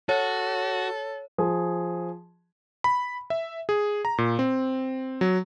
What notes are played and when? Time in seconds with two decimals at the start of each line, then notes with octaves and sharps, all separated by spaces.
0.09 F#4 A4 C#5
1.38 F3 G#4
2.84 B5
3.30 E5
3.69 G#4
4.05 A#5
4.18 A#2
4.39 C4
5.21 F#3